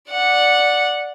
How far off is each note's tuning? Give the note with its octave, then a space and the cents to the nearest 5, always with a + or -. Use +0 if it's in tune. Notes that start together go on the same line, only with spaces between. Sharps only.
D5 +0 F#5 -10